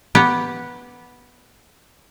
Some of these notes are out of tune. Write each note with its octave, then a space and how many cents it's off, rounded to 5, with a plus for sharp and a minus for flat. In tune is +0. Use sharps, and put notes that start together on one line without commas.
B3 -5 G4 +0